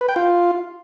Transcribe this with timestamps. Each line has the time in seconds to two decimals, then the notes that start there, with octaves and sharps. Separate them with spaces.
0.01 B4
0.09 G5
0.16 F4